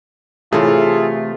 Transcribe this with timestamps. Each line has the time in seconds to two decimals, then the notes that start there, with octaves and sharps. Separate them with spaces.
0.53 C3 E3 A3 F4 G#4 A4 C#5